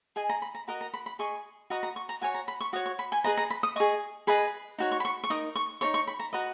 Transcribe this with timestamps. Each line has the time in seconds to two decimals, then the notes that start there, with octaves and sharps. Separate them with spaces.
0.16 G#4 D#5 G#5
0.29 A#5
0.42 B5
0.55 A#5
0.68 F#4 A#4 D#5 A#5
0.81 A#5
0.94 B5
1.06 B5
1.19 G#4 D#5 C#6
1.70 F#4 B4 D#5 A#5
1.83 A#5
1.96 C#6
2.09 A#5
2.21 F#4 C#5 G#5
2.34 A#5
2.48 B5
2.61 C#6
2.73 F#4 C#5 D#6
2.86 C#6
2.99 B5
3.12 G#5
3.24 G#4 B4 D#5 A#5
3.37 A#5
3.50 B5
3.63 D#6
3.76 G#4 D#5 C#6
4.27 G#4 B4 D#5 B5
4.78 D#4 F#4 C#5
4.92 C#6
5.00 B5
5.05 C#6
5.24 C#6
5.30 D#4 A#4 D#6
5.55 C#6
5.81 D#4 A#4 C#5 C#6
5.94 C#6
6.07 B5
6.19 A#5
6.33 F#4 B4 D#5 A#5